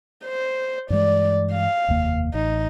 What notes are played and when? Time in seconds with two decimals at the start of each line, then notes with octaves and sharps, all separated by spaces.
0.24 C5
0.90 G2 E3 G#3 D5
1.52 F5
1.88 F1 D#2 A#3
2.34 A1 D#4